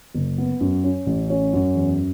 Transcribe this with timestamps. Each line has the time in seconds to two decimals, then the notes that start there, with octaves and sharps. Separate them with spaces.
0.14 F#1
0.38 B3
0.61 F#2
0.84 C#4
1.06 A1
1.30 C#4
1.53 F#2
1.75 E2